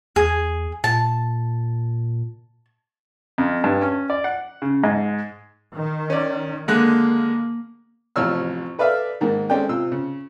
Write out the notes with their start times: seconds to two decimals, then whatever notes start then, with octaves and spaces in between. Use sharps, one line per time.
0.16 E2 G#4
0.84 A#2 A5
3.38 F2
3.64 G2
3.82 C#4
4.10 D5
4.24 F#5
4.62 C#3
4.84 G#2
5.73 D#3
6.10 C#4 D5
6.68 D3 G#3 A#3 F#6
8.16 A1 F2 C3 C#5 E6 F6
8.79 A4 B4 D5 E5 F5
9.21 G#2 D#3 A#3
9.50 G#3 C4 C#4 A4 D5 G5
9.69 C3 F4 E6
9.92 C#3